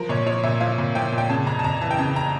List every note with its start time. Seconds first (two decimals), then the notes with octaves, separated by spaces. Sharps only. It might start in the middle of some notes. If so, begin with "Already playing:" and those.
Already playing: F3 A#4
0.09 A#2 C#5
0.26 F3 C#5
0.43 A#2 E5
0.60 F3 F5
0.78 A#2
0.95 F3 G5
1.12 A#2
1.18 G5
1.30 C#3 A5
1.47 F2 A#5
1.59 A5
1.64 F2 A#5
1.81 E3 A5
1.91 G5
1.99 C#3 A5
2.16 A#5